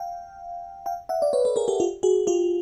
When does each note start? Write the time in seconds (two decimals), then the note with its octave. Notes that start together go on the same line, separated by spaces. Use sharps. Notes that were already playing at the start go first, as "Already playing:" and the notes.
Already playing: F5 G5
0.86 F5 G5
1.09 E5 F#5
1.22 D5
1.33 B4 C#5
1.45 A4 B4
1.56 G#4 A#4
1.68 G4 A4
1.80 F4 G4
2.03 F#4 G#4
2.27 F4 G4